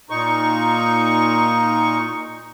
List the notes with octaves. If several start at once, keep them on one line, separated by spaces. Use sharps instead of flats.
A#2 D#4 C#6